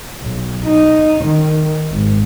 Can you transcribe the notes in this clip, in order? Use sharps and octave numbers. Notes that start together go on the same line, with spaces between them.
B1
D#4
D#3
G#1